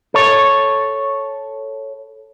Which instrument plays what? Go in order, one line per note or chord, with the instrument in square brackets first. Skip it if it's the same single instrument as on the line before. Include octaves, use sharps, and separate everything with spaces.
[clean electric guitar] A4 C#5